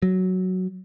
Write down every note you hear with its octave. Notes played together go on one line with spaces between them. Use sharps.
F#3